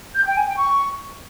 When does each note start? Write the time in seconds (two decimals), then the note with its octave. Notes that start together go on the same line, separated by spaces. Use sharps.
0.14 G6
0.25 G5
0.36 G#5
0.46 G5
0.57 C#6